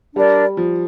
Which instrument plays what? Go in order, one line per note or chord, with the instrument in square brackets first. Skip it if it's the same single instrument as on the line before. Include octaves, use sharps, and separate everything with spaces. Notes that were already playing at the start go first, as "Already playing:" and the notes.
[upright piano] G3 [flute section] D4 A#4 D5
[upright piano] F3